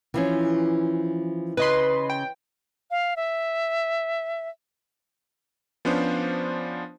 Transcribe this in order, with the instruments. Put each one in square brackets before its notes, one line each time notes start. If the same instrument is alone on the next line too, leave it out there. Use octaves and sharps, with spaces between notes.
[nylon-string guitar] E3 F3 C#4
[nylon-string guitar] C#3 [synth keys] B4 D#5 C6
[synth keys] G5
[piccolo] F5
E5
[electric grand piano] F3 B3 C#4 D4 F4 C5